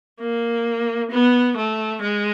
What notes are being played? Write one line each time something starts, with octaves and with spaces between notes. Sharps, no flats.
A#3
B3
A3
G#3